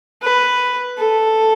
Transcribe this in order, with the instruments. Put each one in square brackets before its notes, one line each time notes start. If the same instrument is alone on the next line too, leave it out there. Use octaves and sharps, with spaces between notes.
[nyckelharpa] B4
A4